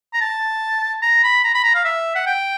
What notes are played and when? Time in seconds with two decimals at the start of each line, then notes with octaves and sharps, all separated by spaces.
0.14 A#5
0.21 A5
1.02 A#5
1.23 B5
1.44 A#5
1.54 B5
1.64 A#5
1.75 F5
1.85 E5
2.15 F#5
2.27 G5